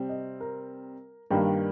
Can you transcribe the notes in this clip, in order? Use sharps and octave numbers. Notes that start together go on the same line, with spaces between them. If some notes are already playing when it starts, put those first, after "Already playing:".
Already playing: C3 G3 C4
D#5
A#4
G2 D#3 G3 A#3 G4